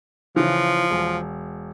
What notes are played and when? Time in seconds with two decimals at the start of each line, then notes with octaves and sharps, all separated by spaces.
0.36 C#3 E3 F3
0.91 E1